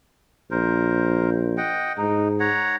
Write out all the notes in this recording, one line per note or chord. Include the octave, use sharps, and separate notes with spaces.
A#1 A#4 C5
D#5 F#5 G5
G#2 D#4
C#5 F#5 A#5